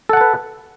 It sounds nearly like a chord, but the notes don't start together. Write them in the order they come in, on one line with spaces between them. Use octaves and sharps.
A4 F#5 A5 B4